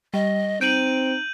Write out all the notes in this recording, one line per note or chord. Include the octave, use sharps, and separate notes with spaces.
G3 D#5
C4 D#4 G6 D7 D#7 F#7